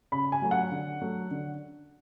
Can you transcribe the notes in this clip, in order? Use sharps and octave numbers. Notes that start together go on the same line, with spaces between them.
C#3 B5
G#5
F#3 A3
F#5
D3
F#3 A3
D3